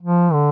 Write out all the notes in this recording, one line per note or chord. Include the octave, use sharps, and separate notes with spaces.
F3
D3